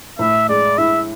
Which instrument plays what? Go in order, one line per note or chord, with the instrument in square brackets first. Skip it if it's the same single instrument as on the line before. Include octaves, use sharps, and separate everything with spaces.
[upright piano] A2 [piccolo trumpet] E5
[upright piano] G#3 [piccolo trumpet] D5
[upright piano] E4 [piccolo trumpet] E5